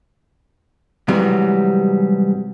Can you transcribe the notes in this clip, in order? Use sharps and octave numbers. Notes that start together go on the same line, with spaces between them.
G#2 C3 E3 F#3 G3